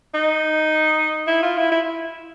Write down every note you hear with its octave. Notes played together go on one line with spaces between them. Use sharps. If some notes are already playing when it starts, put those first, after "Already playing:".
D#4
E4
F4
E4
E4